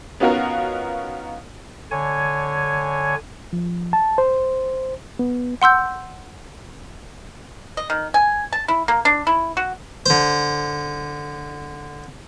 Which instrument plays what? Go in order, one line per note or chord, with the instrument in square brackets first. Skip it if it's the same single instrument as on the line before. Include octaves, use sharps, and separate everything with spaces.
[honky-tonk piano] B3 C#4 D#4 F4 F#4 A#4
[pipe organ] D3 C#5 G#5
[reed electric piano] F3
A5
C5
B3
[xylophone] F#5 C6 E6 G6
[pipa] D#5
D#3
G#5
A5
E4
A#3
D4
E4
F#4
[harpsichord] D3 C5